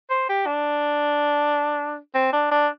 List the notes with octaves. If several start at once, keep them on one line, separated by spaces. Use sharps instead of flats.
C5
G4
D4
C4
D4
D4